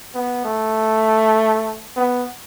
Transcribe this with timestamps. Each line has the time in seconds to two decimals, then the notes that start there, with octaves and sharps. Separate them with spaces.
0.15 B3
0.45 A3
1.97 B3